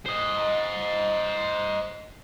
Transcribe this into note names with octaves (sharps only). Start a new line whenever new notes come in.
C5 D#5